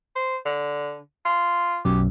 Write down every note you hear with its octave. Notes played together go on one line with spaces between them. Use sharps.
C5
D3
F4
B1 F#2 G4